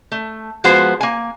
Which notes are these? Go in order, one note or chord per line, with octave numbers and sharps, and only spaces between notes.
A3
F3 G#3 B3 F#4 C5
A#3 G#5